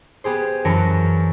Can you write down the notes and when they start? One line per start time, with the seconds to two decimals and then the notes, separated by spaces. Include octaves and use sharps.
0.24 B3 G4 G#4 C5
0.65 F#2 E3 A#4 A5 C#7 D7